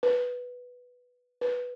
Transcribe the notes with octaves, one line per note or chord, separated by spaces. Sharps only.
B4
B4